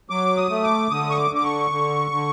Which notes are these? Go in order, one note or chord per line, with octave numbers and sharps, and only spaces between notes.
F#3 D6
D#6
A3
D6
D3 D#6
C#6
D6
D3 D6
C#6
D3
D3